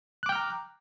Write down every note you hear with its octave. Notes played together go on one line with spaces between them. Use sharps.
G5 A#5 D6 F6 F#6